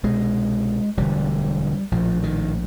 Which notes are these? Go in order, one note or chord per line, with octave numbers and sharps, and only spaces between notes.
C2 B2 G#3
E1 D2 D3 G3
A#1 A2 F3
D#3